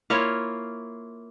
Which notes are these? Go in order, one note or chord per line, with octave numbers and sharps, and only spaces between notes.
A#3 E4 F4 C#5